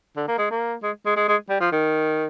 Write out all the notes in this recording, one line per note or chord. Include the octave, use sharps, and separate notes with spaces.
D3
A#3
G#3
A#3
G#3
G#3
G#3
G#3
G3
F3
D#3